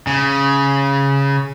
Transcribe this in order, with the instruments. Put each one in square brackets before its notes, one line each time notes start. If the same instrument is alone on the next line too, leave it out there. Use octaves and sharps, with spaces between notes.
[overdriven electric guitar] C#3